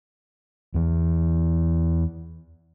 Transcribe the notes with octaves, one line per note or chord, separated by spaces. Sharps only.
E2 E3